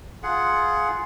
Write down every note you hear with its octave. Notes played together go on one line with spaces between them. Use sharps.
F4 G#4 F#5